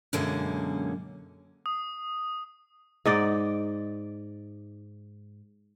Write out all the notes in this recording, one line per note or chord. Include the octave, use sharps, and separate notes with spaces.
F#2 B2 D3 G#3 A#3 C#4
D#6
G#2 D#4 D5 F#5